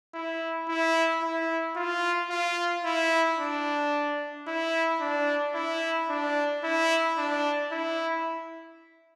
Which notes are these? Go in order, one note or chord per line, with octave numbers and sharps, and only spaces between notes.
E4
E4
E4
F4
F4
E4
D4
E4
D4
E4
D4
E4
D4
E4